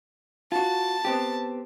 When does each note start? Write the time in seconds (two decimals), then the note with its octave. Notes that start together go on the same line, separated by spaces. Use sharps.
0.52 F4 F#4 A5
1.05 B3 C4 G4